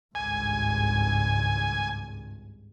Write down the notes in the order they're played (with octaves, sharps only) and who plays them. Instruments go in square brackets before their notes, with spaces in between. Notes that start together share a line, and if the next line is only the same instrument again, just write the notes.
[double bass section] G#1 C#2 G2 [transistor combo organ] G#5